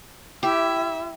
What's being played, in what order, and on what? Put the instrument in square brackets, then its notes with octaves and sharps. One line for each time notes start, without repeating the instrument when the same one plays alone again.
[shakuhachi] E4 [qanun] G4 [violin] E5